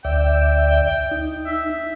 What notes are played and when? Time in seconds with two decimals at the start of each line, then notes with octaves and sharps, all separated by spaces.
0.05 D2 D5 E5 G5
1.11 D#4
1.46 E5